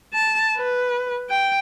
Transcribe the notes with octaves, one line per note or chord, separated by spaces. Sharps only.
A5
B4
G5